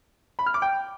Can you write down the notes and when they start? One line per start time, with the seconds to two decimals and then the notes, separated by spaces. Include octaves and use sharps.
0.39 B5
0.46 F6
0.54 D6
0.62 G5